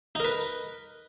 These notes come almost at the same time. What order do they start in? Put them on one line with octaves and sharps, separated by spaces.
D#4 A#4 B4